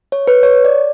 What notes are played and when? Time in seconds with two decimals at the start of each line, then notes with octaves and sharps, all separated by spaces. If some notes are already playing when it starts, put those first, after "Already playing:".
0.12 C#5
0.27 B4
0.43 C#5
0.65 D5